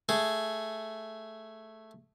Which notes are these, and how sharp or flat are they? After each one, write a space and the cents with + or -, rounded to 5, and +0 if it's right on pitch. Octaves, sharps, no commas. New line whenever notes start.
A3 +0 G#4 +0